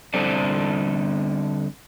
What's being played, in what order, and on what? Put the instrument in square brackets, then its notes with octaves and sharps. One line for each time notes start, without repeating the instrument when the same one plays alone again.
[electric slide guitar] D3 G3 C4 A4 C5 D5